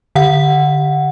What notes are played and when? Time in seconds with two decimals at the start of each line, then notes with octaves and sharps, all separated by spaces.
0.15 D3 F#5